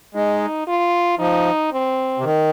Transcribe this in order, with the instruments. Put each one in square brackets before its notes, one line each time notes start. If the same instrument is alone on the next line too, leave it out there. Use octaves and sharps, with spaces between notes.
[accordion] G#3 [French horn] D#4
[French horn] F4
[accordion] F3 [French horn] D#4
[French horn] C4
[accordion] C3
D#3